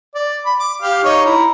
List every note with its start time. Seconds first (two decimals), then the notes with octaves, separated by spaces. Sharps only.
0.15 D5
0.46 B5
0.59 D6
0.82 G4 F5
1.04 D#4 C#5 C#6
1.26 E4 A#5